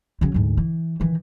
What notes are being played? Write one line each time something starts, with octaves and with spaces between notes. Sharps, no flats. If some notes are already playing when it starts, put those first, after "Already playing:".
C#3 F#3
D2 G#2
E3
D#3 E3